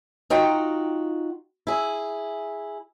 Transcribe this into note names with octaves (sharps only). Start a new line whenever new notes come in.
D#4 F4 F#4 G5 A#5
E4 G#4